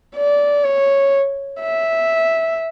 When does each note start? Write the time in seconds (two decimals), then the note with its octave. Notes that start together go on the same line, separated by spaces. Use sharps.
0.17 D5
0.64 C#5
1.61 E5